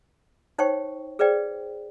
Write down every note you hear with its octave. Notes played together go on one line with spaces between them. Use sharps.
D#4 C5 C#5 G5 C#6
G#4 B4 C5 D5 G5